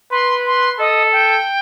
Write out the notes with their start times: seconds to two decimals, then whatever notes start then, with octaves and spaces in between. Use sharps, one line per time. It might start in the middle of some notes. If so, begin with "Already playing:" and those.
0.11 B4 C6
0.46 C6
0.79 A4 D#5
1.12 G5